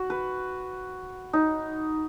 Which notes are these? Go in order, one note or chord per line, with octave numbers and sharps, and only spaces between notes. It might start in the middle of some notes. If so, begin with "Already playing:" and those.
Already playing: F#4
B4
D#4